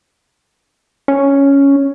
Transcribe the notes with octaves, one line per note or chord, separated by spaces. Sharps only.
C#4